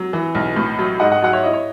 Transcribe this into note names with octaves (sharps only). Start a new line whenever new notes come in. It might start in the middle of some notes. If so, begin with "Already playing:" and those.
Already playing: F#3
E3
B1
A2
F#3
G#2 D#5 F#5
D#5 F#5
F#3 F#5
C#5 E5
E4 D#5
C#5